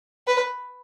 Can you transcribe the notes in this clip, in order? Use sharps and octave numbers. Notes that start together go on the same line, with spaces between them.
B4